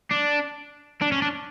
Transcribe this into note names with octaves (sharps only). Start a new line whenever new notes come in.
D4
D4
C#4
D4